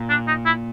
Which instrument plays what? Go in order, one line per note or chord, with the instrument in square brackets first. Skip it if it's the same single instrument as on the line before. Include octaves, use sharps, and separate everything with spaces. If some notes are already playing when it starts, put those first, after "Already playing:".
Already playing: [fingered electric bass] A#2
[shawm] D4
D#4
E4